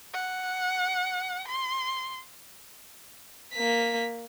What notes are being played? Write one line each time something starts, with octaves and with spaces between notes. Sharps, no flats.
F#5
C6
A#3 B6